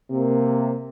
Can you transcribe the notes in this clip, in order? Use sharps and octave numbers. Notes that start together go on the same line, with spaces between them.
C3 A#3